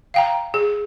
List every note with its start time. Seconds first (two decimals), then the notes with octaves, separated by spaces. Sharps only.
0.14 F5 G5 A#5
0.54 G#4